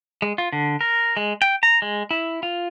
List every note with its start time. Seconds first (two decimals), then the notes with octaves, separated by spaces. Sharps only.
0.22 G#3
0.38 F4
0.52 D3
0.81 A#4
1.17 G#3
1.42 G5
1.63 A#5
1.82 G#3
2.11 E4
2.43 F4